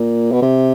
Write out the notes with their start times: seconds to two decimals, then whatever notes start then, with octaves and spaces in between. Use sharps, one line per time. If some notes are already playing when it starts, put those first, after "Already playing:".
Already playing: A#2
0.32 B2
0.42 C3